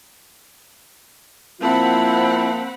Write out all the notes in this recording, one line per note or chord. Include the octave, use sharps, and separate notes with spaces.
F3 A#3 C4 E4 F4 F#5 A5 B5